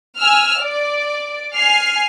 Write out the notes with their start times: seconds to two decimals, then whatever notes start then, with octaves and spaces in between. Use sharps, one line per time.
0.18 G#5 E6 F6
0.62 D5
1.55 G#5 F6 C7